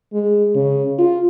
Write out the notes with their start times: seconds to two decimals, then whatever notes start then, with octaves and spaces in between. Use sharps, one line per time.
0.13 G#3
0.55 C#3
0.99 F4